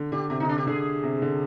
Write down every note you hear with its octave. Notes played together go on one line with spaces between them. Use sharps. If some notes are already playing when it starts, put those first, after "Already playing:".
Already playing: D3
D3 G4
C3 G4
D3 D#4
D4
G4
D3 G#4
C3
D3